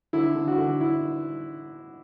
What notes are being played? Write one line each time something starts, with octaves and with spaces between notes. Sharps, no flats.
D3 E4
D3
F#4
D3
E4